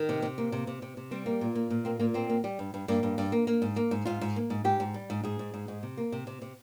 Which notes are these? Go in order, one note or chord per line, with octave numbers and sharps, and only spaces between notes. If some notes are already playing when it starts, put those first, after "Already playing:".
Already playing: D#3
C3
C3
A#3
C3
C3
C3
C3
G3 C4
A#3
A#2
A#3
A#2
A#3 C4
A#2 A#3
A#3 C4
A#3
G3
G2
G2
G2 A#3
G2
G2
A#3
A#3
G#2
A#3
G#2
G#2 F4
G#2
A#3
G#2
G#2 G4
G#2
G3
G#2
G#2 G#4
G#2
G#2
G#2
C3
A#3
C3
C3
C3